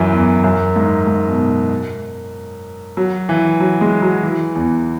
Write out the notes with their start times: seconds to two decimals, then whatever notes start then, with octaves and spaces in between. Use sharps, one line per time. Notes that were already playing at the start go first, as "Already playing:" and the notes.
Already playing: F#2 E3
0.12 E2
0.44 F#2
0.76 G#2
1.07 G#2
1.28 B2
2.97 F#3
3.29 E3
3.60 F#3
3.81 G#3
4.02 F#3
4.23 E3
4.55 E2